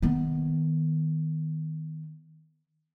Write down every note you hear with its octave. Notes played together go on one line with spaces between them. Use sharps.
D#3 B3